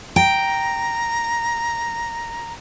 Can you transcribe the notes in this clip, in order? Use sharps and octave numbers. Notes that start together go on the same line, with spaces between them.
G5 A#5